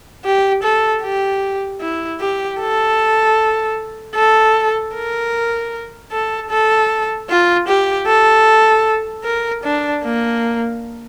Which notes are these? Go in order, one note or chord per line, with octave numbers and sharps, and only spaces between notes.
G4
A4
G4
E4
G4
A4
A4
A#4
A4
A4
F4
G4
A4
A#4
D4
A#3